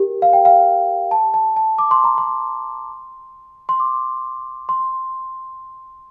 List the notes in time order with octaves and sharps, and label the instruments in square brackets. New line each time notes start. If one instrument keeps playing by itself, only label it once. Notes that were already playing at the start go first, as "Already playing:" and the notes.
Already playing: [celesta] G4 A#4
F5
G5
F5
A5
A5
A5
D6
C6
A#5
C6
C6
D6
C6